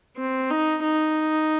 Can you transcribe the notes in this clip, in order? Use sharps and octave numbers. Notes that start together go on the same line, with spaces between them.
C4
D#4
D#4